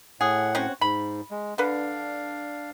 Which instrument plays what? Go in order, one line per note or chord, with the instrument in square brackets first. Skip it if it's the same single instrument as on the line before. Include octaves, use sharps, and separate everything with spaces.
[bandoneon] A2 F#5 [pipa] G#4
[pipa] C4 C#4 F#4
[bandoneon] G#2 [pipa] B5
[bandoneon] G#3
[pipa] D3 B4 [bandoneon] D4 F5